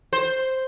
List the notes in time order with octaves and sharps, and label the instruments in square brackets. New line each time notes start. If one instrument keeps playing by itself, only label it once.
[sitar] C5